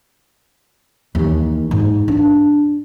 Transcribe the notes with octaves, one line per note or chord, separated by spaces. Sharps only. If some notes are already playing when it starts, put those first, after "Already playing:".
D#2 E3
G#2
D4